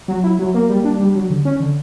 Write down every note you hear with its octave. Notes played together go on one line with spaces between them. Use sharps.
F#3
E4
F#3
A#3
G3
D4
G3
F#3
D3
C#4
D3